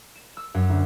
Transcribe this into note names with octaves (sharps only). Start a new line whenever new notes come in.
E7
E6
F#2
D2